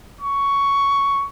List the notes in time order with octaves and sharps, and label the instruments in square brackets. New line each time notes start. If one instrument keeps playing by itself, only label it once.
[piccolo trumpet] C#6